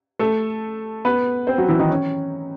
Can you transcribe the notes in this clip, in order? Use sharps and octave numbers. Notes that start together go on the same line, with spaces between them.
A3 A4
B3 B4
C4 C5
F#3 F#4
E3 E4
D#3 D#4
C#4